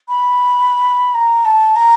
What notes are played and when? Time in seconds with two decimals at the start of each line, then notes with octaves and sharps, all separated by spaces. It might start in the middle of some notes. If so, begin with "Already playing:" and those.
0.09 B5
1.15 A#5
1.45 A5
1.76 A#5